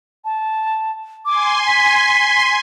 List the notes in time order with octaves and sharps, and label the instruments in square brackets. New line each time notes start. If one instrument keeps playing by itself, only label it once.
[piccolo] A5
[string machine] G#5 C6 [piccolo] D6
[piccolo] B6